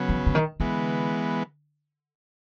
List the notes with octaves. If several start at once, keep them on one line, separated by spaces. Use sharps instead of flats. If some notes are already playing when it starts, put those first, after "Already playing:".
Already playing: C#3 F#3 B3
E3
D3
D#3
D3 E3 G#3 B3